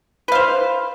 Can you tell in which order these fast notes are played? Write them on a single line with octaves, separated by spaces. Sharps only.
B4 F5 C5